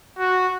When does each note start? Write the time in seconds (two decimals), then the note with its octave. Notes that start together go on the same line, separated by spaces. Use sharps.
0.19 F#4